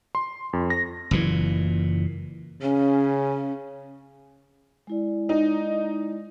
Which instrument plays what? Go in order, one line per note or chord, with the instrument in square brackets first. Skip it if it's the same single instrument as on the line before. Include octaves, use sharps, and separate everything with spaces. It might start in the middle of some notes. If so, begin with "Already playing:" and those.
[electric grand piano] C6
F2
A#6
[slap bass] F#1 A#2 E3
[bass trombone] C#3 [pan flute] C#4
[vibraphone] G#3 E4 D5
[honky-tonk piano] D#4